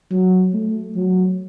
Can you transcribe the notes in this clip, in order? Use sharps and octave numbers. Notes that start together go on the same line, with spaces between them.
F#3
A3
F#3